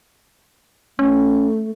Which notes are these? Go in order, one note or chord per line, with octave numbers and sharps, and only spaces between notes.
A3 C#4